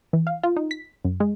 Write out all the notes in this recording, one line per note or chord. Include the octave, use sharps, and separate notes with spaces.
E3
F5
F4
D#4
B6
F#2
G#3